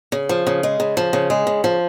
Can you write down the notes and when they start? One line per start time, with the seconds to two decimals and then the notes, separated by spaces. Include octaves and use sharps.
0.12 C#3
0.29 F3
0.47 C#3
0.63 G#3
0.80 C#3
0.97 F3
1.13 C#3
1.30 G#3
1.47 C#3
1.64 F3